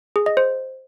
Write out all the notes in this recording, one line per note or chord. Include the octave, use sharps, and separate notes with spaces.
G#4
D#5
C5